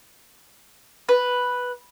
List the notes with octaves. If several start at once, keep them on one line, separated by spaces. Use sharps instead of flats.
B4